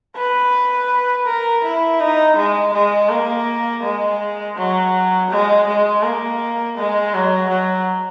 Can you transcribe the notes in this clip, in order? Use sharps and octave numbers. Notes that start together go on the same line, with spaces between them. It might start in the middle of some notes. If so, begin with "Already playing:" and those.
B4
A#4
E4
D#4
G#3
G#3
A#3
G#3
F#3
G#3
G#3
A#3
G#3
F#3
F#3